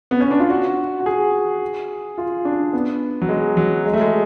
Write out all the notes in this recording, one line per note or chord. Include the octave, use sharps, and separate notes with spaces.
B3
C#4
D4
F4
F#4
F#4
G#4
F4
D4
B3
F#3
G#3
F#3
G#3
A3
G#3